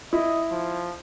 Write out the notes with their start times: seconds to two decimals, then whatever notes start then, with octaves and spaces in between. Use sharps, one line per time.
0.13 E4 D#5
0.51 F3